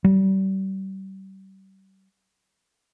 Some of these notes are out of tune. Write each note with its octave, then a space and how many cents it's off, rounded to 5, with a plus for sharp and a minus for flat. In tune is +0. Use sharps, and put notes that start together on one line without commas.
G3 -35